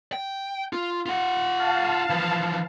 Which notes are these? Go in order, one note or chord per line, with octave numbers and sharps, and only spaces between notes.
G5
F4
F4 F#5
F5 A5
E3 F3